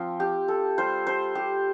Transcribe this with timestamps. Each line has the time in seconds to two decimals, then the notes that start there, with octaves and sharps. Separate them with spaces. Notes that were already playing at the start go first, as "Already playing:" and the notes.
Already playing: F3 C4 F4
0.20 G4
0.48 A4
0.78 G3 F4 C5
1.07 C5
1.35 G4